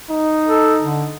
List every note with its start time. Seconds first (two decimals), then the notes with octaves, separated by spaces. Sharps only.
0.11 D#4
0.48 A4
0.82 D3